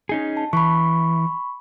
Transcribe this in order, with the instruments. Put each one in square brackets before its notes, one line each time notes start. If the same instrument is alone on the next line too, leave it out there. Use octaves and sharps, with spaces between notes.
[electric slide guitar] C#4 D#4 G#4
[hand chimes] A5
[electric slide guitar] E3 [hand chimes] B5 C#6